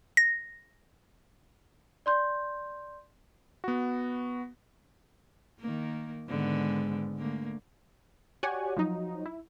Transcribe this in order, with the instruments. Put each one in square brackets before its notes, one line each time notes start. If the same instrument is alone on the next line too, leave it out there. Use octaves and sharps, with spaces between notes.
[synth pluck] A#6
[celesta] D5 C6 G6
[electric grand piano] B3 F#4
[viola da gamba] D#3 A#3
[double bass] G#2 G#3 [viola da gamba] D3 D#3 B3
[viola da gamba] D3 A3 A#3
[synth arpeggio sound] F#4 G4 C#5 D5 F#5 G#5
F3 F#3 D#4
E4